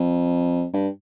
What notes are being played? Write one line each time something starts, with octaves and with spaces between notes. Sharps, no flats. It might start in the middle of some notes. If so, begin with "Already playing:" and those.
Already playing: F2
G2